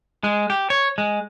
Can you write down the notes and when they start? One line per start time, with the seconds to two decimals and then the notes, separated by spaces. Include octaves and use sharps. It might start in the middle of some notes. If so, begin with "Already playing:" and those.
0.24 G#3
0.50 G4
0.70 C#5
0.98 G#3